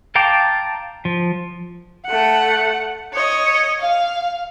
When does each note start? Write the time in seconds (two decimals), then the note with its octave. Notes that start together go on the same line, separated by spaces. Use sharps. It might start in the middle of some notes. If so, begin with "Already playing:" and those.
0.15 F5 G5 A5 A#5 D6
1.05 F3
2.06 A3 F#5
3.14 C#5 D#5
3.81 F5